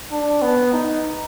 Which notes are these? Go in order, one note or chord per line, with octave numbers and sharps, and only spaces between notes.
D4
B3
D#4